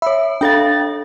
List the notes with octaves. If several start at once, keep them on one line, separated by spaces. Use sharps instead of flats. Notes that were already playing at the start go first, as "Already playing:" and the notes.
C#5 E5 B5
D4 A4 F5 G5 A6